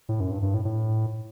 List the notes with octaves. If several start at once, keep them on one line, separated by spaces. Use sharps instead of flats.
A2
F#2
G2
G2
A2
A2